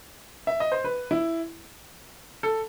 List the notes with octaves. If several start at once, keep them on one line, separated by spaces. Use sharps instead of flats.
E5
D#5
C5
B4
E4
A4